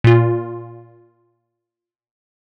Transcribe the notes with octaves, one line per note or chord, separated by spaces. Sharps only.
A#2 F4